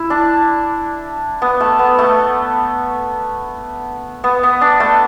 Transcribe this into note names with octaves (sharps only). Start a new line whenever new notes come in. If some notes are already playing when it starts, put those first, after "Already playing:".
Already playing: E4
D4
B3
A3
B3
A3
B3
B3
D4
A3